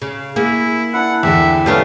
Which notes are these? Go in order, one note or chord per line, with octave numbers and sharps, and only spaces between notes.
C#3
A#3 E4 G#4
D4 E4 F#5
E2 D3 E5 G5
G3 A3 B3 C#4 D4 E4 F5